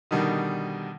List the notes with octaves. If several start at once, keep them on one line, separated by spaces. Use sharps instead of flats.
B2 D3 D#3 G3